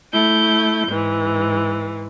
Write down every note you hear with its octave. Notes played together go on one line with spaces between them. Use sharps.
A3 E4 G6
G#2 E3